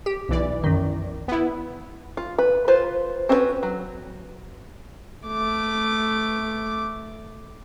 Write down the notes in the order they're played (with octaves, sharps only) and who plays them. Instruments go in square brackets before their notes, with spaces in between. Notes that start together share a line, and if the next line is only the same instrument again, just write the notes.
[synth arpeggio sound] G4
[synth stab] B1 E3 D5
[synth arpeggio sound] F#2 D#3
[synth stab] B3 E4
[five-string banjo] F4
B4
F4 B4 C5
C4 C#4 F#4 G#4 B4
F#3
[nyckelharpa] A3 D6